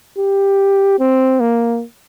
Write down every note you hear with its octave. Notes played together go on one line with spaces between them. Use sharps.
G4
C4
A#3